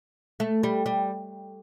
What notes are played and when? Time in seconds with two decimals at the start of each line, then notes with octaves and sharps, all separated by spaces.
0.40 A3
0.63 G3
0.86 G3